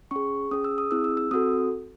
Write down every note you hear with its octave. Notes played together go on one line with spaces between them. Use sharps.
C#4 G#4 C#6
C#4 G#4 D#6
E6
D#6
C4 E4 G#4 E6
E6
E6
C4 F#4 A4 D#6